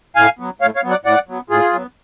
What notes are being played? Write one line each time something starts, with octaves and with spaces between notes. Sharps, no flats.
A2 F5 G#5
F#3 B3
A2 C#5 F5
C#5 F5
F#3 B3
D5 F#5
A2 D5 F#5
F#3 B3
A2 F4 G#4
F#3 B3